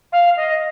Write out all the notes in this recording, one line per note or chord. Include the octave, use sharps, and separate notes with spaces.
F5
D#5